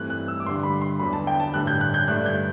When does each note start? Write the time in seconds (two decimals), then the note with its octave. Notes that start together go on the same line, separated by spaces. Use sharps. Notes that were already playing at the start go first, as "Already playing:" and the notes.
Already playing: G2 E3 A3 C4 F#6
0.10 F#6
0.28 E6
0.40 D6
0.46 G2 D3 G3 C6
0.63 B5
0.81 C6
1.00 E2 D3 F#3 B5
1.13 A5
1.27 G5
1.40 A5
1.53 A1 G2 D3 F#6
1.67 G6
1.81 F#6
1.94 G6
2.08 G2 D3 A3 D4 F#6
2.26 G6